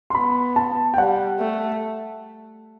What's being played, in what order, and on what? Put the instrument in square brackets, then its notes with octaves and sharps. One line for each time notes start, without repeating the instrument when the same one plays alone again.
[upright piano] C6
[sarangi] B3 [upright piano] B5
[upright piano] A5
G5
[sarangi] G3 [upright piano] F#5
[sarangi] A3